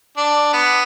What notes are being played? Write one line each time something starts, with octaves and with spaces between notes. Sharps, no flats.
D4
B3